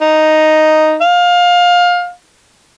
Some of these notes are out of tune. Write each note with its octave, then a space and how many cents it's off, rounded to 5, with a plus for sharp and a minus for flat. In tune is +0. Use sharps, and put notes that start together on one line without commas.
D#4 +0
F5 +20